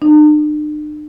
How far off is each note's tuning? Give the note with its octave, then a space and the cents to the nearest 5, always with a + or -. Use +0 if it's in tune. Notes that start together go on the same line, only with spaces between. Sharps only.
D4 +45